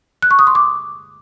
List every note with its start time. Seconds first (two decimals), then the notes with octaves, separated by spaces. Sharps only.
0.22 F#6
0.31 C#6
0.39 D#6
0.47 C6
0.55 D6